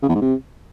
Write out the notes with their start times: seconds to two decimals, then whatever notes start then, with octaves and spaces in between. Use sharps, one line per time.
0.02 C#3
0.09 E2
0.15 G#2
0.21 C3